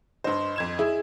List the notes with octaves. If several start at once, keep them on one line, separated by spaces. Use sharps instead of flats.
G2 C5 D#5 C6
F2 G#6 E7
E4 G#4